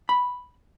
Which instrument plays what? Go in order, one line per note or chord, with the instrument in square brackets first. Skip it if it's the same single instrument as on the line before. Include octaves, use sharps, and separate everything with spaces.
[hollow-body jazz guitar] B5